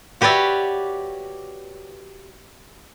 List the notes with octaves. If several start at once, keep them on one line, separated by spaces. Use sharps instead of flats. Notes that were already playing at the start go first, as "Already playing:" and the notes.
F#4 G4 B4 C#5 D5 E5